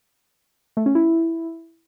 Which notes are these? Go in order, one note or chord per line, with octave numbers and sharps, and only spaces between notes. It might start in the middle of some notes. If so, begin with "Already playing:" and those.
A3
C#4
E4